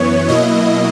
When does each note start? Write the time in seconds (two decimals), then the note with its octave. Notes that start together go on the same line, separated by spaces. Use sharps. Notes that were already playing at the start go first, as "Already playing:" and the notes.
Already playing: F#2 E3 B3 C#5
0.28 B2 F#3 A#3 E4 D#5